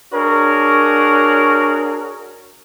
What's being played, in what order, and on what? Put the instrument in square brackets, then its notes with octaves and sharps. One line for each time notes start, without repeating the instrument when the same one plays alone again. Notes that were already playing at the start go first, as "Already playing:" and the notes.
[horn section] D4 F#4 G#4 A#4 C#5